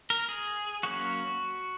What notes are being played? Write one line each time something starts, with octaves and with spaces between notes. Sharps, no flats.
A#4
G#4
F#3 A#3 C#4 F#4